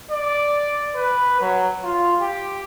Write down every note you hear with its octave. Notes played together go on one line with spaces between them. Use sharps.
D5
B4
F#3
F4
G4